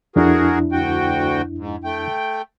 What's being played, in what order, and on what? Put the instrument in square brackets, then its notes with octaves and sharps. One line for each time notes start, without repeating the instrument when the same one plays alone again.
[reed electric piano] F2 D4 E4 [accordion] F#4 G#4 A#4
[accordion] D2 F#4 G5
G#2
A3 G5